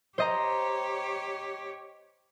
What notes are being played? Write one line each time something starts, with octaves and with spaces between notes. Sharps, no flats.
G4 C5 C#5 D#5 A#5